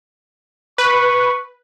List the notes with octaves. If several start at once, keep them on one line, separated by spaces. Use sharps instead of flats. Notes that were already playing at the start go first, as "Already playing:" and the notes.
B4 C#6